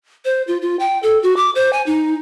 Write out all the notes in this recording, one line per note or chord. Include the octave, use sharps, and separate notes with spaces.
C5
F4
F4
G5
A4
F#4
D6
C5
G#5
D#4